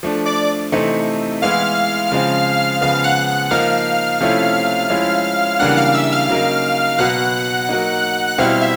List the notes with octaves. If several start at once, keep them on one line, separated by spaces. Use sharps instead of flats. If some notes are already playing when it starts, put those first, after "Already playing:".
F3 A3 D4
D5 D6
C3 E3 A3 C4 D#4
E3 G#3 B3 E4 F5 F6
C#3 F3 G#3 C4
C#3 F3 G#3 B3 F5 F6
F#5 F#6
F#5 F#6
F3 A#3 D#4 F5 F6
C3 F3 A3 C#4 E4
F3 G#3 C#4 E4
C#3 E3 G3 A#3 D4 F#5 F#6
F5 F6
E5 E6
F5 F6
C#3 F#3 A#3 D#4
B2 F#3 B3 F#5 F#6
F#3 A#3 D#4
F#6
B2 G3 C4 E4 F5 F6
E5